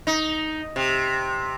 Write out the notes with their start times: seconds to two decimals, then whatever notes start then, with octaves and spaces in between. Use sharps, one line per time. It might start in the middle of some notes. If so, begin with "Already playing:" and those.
0.07 D#4
0.76 C3